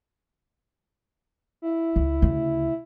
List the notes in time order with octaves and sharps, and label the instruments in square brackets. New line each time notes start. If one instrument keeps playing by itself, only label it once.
[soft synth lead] E4
[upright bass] C#2
D2 C#3